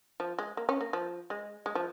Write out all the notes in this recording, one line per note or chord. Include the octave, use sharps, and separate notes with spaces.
F3
G#3
A#3
C#4
A#3
F3
G#3
G#3
F3